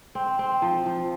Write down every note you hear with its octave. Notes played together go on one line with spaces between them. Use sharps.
C4
C4
F3
F3